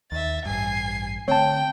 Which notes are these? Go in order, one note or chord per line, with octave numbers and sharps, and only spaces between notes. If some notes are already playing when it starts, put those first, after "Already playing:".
D#2 E5 A6
A1 G2 G#5 C7
D3 A3 C4 C#5 G5 A5